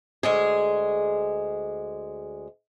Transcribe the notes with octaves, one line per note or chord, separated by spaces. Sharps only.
D2 G#3 G#4